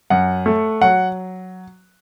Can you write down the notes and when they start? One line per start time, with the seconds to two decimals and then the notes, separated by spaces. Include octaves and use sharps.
0.10 F#2 F#5
0.46 A3
0.82 F#3 F#5